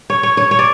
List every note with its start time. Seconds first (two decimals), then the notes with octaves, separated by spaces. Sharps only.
0.10 C#5
0.23 C#5
0.37 C#5
0.51 C#5
0.59 D5